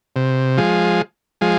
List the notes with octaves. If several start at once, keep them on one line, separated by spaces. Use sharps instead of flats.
C3
F3 G#3
F3 G#3